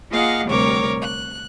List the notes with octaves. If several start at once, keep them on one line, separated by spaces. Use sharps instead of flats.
A#3 F4 G#4 D#5 F5 F#5
D2 C3 G3 A#4 C#5 D6
F#6